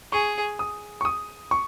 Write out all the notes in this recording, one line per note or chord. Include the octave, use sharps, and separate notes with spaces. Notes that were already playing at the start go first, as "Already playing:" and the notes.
G#4 C#6
D#6
C#6
D#6
C#6